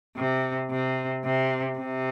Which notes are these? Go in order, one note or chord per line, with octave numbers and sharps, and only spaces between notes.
C3
C3
C3
C3